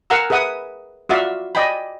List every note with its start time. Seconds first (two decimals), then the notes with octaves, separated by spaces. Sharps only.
0.10 A#4 F5 F#5 G#5 A#5 E6
0.30 G#4 B4 E5 F#5 D#6
1.09 F4 F#4 D5 E5 F5
1.55 D5 D#5 G5 G#5 B5